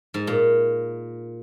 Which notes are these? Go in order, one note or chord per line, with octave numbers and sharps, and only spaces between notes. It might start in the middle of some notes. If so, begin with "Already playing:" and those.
G#2
A#2